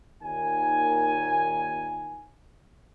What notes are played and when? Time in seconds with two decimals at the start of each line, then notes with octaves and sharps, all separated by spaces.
0.24 D#2 A#2 D#3 G#5